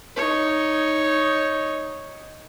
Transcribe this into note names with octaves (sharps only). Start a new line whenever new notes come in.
D#4 C#5